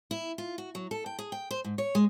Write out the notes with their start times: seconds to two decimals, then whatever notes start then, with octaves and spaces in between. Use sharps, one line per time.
0.11 E4
0.38 F4
0.58 F#4
0.75 F#3
0.91 A4
1.06 G5
1.19 G#4
1.32 G5
1.51 C5
1.65 G#2
1.78 C#5
1.95 G#3